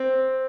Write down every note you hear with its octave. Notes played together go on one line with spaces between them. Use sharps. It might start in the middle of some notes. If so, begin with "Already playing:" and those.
Already playing: C4